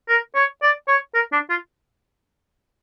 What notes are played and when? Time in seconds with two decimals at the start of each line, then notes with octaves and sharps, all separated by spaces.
0.09 A#4
0.36 C#5
0.63 D5
0.88 C#5
1.15 A#4
1.32 D4
1.50 F4